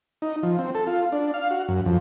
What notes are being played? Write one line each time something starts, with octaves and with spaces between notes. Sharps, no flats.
D#4
F3
C4
A4
F4
D4
F5
F#4
F#2
F2